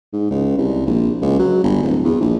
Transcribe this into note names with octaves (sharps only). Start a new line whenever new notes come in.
G#2
C#2
C2
A#1
C#2
F#3
G1
D1
E2
A#1